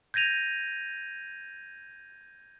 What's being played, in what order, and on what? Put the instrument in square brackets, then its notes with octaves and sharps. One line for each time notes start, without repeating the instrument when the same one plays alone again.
[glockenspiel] G6 G#6 A#6 D#7 F7